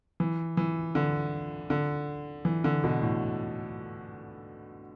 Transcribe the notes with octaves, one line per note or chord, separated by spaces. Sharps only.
E3
E3
D3
D3
E3
D3
B2
A2